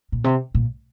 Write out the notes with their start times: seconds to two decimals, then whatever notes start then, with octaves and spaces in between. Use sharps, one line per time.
0.12 A#2
0.24 C3
0.55 A#2